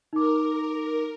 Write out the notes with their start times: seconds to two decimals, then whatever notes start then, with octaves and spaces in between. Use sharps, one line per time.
0.13 D#4 A#4 D6